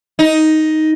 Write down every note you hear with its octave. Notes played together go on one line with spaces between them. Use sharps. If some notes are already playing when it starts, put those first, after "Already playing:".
D#4